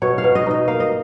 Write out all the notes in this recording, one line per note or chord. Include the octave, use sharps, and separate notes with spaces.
B2 C#5
F5
B2
D#5
D#4 D#5
A#3 F5
D#5